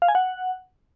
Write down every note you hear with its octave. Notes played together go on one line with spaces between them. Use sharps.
F5
G#5
F#5